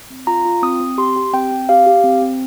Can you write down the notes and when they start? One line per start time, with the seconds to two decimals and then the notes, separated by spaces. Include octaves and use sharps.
0.10 C4
0.27 F4 A#5
0.45 F4
0.63 C4 D#6
0.80 C4
0.98 G4 C6
1.16 G4
1.33 C4 G5
1.51 C4
1.69 G4 F5
1.86 G4
2.04 C4
2.22 C4